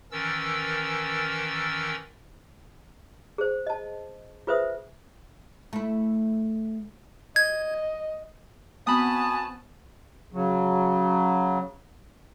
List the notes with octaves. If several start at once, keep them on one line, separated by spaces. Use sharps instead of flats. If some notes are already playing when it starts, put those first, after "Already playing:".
D#3 E3 C#4 A#4 E6 A6
G#4 C5
D#5 A5
F4 G#4 B4 C5 E5 D#6
A3 E4
D#5 G#6
B3 C4 F#4 G#5 A5 B5 D#6
C#3 F#3